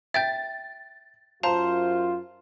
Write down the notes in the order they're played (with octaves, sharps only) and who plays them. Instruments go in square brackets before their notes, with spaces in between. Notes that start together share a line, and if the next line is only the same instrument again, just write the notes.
[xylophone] E5 G5 G6 [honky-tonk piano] A6
[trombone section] F#2 F4 [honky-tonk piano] C5 [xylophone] F5 A5 A#5